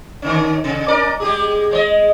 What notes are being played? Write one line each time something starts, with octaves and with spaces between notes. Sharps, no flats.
D3 D#3 C#4
C3
C#4 A#4 D5
G#3 G4 G#4
G#3 C#5 D#5